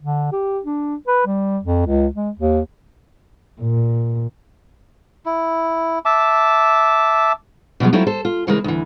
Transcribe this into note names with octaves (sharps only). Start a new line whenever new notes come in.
D3
G4
D4
B4
G3
F2
C#2
G#3
D#2
A#2
E4
E5 A5 D6
B2 F3 F#3 G#3
F#3 A3 C4 C#4 E4 F4
A4 C5
F4
C#3 E3 G#3 C4 A#4
D2 E3